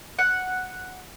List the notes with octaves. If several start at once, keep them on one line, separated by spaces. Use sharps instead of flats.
F#5